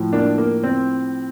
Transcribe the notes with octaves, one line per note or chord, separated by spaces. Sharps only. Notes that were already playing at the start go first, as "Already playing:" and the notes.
Already playing: A2 F3
A#3 D4
A#3
C4